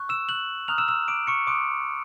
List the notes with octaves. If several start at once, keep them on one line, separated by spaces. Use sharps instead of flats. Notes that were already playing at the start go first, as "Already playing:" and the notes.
Already playing: C#6 F#6
E6 E7
F#6 F#7
A#5 D#6 F6 F#6 F7
E6 E7
E6 E7
D6 D7
C#6 C#7
C6 D6 D#6 F#6 D7